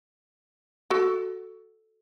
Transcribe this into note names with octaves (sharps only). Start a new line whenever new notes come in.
F#4 A4